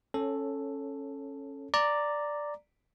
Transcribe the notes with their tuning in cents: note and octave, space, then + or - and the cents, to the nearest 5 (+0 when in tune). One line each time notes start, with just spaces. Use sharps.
C#4 -15 A4 +0 C#5 +0
D5 +0 A#5 -10